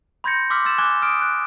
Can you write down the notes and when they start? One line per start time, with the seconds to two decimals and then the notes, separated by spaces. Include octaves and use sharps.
0.24 B5 C6 G6 G#6 A#6 C#7
0.50 C6 D6 E6 F6 B6
0.65 C6 E6 A6 E7
0.78 G#5 D6 F#6 G#6 G7
1.02 D#6 F6 D7
1.22 F#6